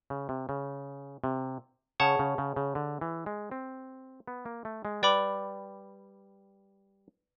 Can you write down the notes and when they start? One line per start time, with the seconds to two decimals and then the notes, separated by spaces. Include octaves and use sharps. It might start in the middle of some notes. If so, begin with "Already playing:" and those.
0.10 C#3
0.29 C3
0.49 C#3
1.24 C3
2.00 C#3 G#4 C#5 F#5 A5 C#6
2.19 C#3
2.38 C#3
2.56 C#3
2.75 D3
3.01 E3
3.26 G#3
3.51 C4
4.28 B3
4.46 A#3
4.65 A3
4.85 G#3
5.03 G3 B4 D5 G5 B5 D6